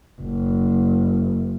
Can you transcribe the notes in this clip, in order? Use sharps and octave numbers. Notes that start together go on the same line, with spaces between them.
F#1